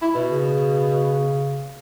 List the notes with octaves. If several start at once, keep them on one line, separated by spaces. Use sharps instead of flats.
E4
B2
C#3